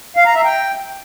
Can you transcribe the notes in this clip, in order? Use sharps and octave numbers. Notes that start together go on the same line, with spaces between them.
F5
A#5
E5
G5